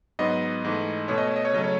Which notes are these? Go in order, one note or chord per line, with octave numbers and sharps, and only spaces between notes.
G#2 F#3 B3 D#5
G#2 E3 A3
B2 A3 C#5
D#5
C#5
D#5
C#5
C#3 F#3 A3 D#5
C#5